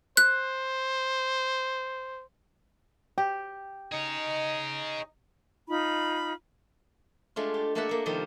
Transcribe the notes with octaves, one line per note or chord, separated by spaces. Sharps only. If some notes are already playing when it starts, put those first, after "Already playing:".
C5 F#6
G4 G5
D#4 G#4 C#5 D#5
D#4 F4 B5
G#3 A3 D4 F4
G4
A3 A#3 A4 D5 E5 F#5
A3 A#3
C3 D#3 F3 G3 A#3 G4